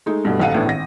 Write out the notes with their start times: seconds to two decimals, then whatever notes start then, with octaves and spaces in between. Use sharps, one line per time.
0.06 G#3 A3 D#4
0.25 G2 B2 A3
0.39 D#1 B1 A4 F5 F#5 D#7
0.54 A2 E3 B3 D4 E4
0.66 G#1 A#6